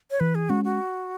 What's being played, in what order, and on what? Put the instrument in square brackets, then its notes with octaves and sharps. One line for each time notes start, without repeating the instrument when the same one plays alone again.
[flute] C#5
[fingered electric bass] E3 [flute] B4
[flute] G#4
[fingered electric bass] G#3 C#4 [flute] F#4
[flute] F#4